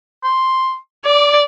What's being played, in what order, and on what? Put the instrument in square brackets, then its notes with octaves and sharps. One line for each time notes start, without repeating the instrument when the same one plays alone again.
[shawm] C6
[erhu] D5 [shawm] D6